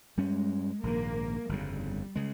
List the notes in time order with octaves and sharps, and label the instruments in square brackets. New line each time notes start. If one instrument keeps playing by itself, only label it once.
[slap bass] G2 G3 C#4 [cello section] G#3
[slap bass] A#1 G#2 D#3 [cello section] A#3
[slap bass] G1 F2 C#3 [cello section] G3
[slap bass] C#3 G#3